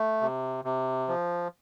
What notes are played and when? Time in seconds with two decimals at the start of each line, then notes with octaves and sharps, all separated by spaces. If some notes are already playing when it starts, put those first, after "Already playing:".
Already playing: A3
0.21 C3
0.65 C3
1.08 F3